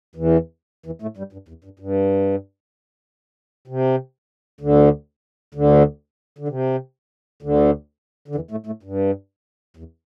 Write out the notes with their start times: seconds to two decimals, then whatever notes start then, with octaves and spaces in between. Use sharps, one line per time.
0.15 E2 E3
0.86 E2 E3
1.02 A2 A3
1.17 G2 G3
1.33 G2
1.48 E2
1.64 G2
1.79 G2
3.68 C3
4.61 D2 D3
5.54 D2 D3
6.38 D3
6.48 C3
7.42 D2 D3
8.28 D3
8.35 E2 E3
8.51 A2 A3
8.66 A2 A3
8.83 G2
9.77 E2